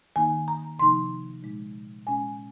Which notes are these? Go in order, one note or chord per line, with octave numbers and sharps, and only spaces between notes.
D#3 A#3 D#4 G#5
A#5
C3 F3 A#3 D#4 C6
A#2 G#3 D#4
A#2 G#3 C#4 G#5